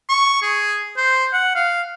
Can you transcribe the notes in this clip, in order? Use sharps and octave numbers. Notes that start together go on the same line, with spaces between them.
C#6
G#4
C5
F#5
F5